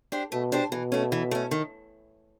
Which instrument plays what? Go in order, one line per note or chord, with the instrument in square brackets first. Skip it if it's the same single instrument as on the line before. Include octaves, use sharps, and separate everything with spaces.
[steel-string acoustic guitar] D4 G4 C5
[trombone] B2 [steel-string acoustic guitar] A3
[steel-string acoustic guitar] D4 G4 C5
[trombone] B2 [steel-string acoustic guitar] E3
[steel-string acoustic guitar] A3 C#4
E3
A3 C#4
D#3